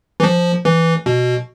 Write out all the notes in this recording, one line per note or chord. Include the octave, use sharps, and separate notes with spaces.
E3
F3
E3
B2